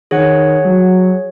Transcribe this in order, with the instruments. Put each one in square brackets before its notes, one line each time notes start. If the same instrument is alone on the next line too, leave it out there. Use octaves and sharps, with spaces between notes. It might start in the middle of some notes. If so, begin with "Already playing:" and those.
[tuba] D#3 [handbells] G#4 C#5 F#5
[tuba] F#3